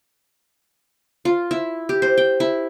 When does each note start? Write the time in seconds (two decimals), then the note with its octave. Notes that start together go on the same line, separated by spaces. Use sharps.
1.25 F4
1.51 E4
1.89 G4
2.02 C5
2.17 G5
2.40 E4